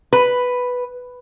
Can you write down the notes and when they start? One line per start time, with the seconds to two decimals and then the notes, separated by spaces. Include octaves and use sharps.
0.13 B4